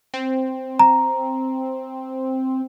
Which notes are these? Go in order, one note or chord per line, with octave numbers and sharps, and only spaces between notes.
C4
A#5